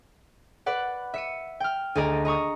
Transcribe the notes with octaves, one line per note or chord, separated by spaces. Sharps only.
B4 D5 F#5
E5 C#7 D#7
G5 F6
D2 G#4 D5 D#5 A#5 D#7
D#5 A#5 C#6 D#6